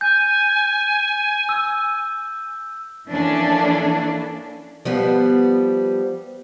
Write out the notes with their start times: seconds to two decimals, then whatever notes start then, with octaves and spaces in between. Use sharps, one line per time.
0.01 G#5 G6
1.49 E6
3.08 E3 F3 A#3 C#4 D4 A4
4.85 F3 G3 B3